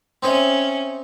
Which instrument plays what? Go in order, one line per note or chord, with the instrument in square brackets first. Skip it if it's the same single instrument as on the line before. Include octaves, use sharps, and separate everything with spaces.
[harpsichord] C4 D#4 C5 [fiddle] C#4 [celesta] E5 C6